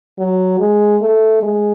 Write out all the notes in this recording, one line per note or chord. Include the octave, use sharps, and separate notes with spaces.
F#3
G#3
A3
G#3